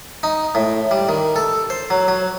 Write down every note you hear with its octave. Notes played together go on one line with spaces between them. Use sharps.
D#4
A2
G3
D#3
A4
C5
F#3
F#3